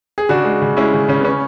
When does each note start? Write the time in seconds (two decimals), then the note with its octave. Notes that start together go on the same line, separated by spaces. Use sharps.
0.18 G#4
0.29 C#3 D4 F#4
0.45 G#3
0.62 C#3
0.77 G#3 C#4 E4
0.94 C#3
1.09 C#3 C#4
1.20 B3
1.25 C#3 C#4